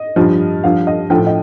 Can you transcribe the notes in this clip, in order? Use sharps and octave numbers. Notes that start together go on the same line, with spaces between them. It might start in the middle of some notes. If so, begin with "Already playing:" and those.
Already playing: D#5
G2 F3
G2 F3 F5
D#5
A2 F3 G5
D#5